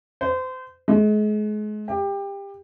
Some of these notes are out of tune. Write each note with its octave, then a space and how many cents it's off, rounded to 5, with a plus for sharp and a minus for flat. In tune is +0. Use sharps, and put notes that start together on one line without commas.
C5 -30
G#3 +35
G4 +20